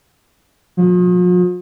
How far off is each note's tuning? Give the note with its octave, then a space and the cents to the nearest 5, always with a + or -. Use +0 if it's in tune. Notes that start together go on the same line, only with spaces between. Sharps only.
F3 +45